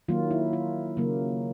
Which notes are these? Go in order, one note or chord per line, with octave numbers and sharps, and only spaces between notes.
D#3 F#3 A#3 F4
E4
F4
C#3 F#3 A#3